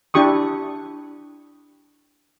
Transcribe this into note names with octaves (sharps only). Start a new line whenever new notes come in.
D4 E4 G4 C#6 D#6